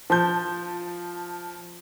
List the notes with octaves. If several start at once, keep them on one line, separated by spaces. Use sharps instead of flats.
F3 A5 G6